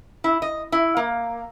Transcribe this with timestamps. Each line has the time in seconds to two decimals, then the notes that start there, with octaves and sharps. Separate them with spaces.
0.24 E4
0.42 D#5
0.72 E4
0.97 A#3